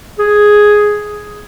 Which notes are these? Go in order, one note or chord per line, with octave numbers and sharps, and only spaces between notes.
G#4